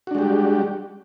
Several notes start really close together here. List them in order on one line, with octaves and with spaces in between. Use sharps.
F#4 D4 G#3 G4 G3